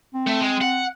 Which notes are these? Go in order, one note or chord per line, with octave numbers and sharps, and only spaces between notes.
C4
A3
G#3
F#5